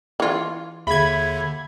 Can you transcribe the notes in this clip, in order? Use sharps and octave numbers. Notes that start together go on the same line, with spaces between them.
E3 F4
D#2 D3 G#4 E5 B5 G#6 G7